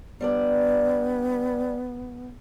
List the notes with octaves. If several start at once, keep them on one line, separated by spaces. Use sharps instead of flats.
G3 B3 D4 D5